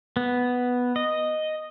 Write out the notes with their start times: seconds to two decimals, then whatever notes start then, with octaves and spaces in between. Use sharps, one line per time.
0.17 B3
0.96 D#5